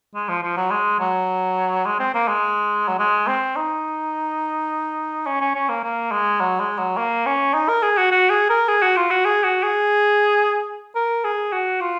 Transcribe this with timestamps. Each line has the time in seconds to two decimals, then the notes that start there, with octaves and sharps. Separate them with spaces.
0.15 G#3
0.29 F3
0.43 F3
0.57 F#3
0.71 G#3
1.00 F#3
1.86 G#3
1.99 C4
2.14 A#3
2.28 G#3
2.88 F#3
2.99 G#3
3.28 C4
3.56 D#4
5.27 C#4
5.41 C#4
5.55 C#4
5.69 A#3
5.83 A#3
6.12 G#3
6.41 F#3
6.60 G#3
6.78 F#3
6.98 A#3
7.26 C#4
7.54 D#4
7.69 A#4
7.83 G#4
7.97 F#4
8.11 F#4
8.30 G#4
8.50 A#4
8.68 G#4
8.82 F#4
8.97 F4
9.10 F#4
9.25 G#4
9.44 F#4
9.63 G#4
10.95 A#4
11.24 G#4
11.52 F#4
11.81 F4